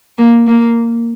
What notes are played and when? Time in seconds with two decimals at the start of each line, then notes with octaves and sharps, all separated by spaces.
0.18 A#3
0.47 A#3